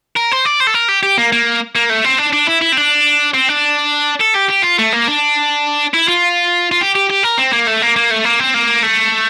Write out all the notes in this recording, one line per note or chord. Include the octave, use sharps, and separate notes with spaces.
A#4
C5
D5
C5
A4
A#4
G4
G4
A#3
A#3
A#3
A3
C4
D4
D4
E4
E4
C4
D4
C4
D4
A4
G4
G4
F4
A3
A#3
D4
E4
F4
F4
G4
G4
G4
A#4
C4
A#3
A3
A#3
A#3
A3
A#3
C4
A#3
A3